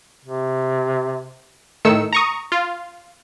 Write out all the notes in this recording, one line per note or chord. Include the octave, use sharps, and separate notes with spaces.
C3
A2 D#3 E6 C#7
A#5 C#6 D#6
F4